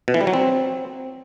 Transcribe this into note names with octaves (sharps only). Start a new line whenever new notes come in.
B2
E3
G3
F#3
C4